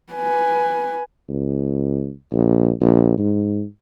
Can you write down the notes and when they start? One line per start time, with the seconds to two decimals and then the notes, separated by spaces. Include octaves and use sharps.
0.13 B4 G#5
1.29 C#2
2.32 A#1
2.81 A#1
3.18 G#2